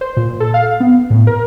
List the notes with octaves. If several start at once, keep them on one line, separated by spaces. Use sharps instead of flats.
C5
A#2
A4
F5
B3
A2
A#4